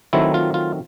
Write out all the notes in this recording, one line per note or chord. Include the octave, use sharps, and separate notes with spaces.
D#3 F#3 A3 C4 E4
F4
F4